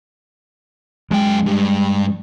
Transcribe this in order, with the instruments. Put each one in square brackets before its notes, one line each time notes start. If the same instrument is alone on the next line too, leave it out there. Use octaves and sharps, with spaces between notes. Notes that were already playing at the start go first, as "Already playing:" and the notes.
[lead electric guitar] F#2 G5 [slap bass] G#3
[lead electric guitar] G2